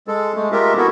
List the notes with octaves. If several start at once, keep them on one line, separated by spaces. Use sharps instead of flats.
G#3 A4
G#3 A3
G#3 A3 F4 G4 A#4 E5
A3 B3 E4 F#4 A4 A#4